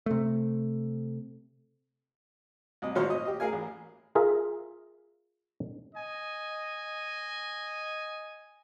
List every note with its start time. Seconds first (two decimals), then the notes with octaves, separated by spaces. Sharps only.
0.06 C3 A3
2.82 C2 D#5
2.95 G#1 A#2 F#3 C5 C#5 F6
3.10 D#5
3.25 G4 D#5
3.40 G#4 A#4 F5 G#5
3.53 A1
4.15 F4 G#4 A#4 E5
5.95 D#5 G#5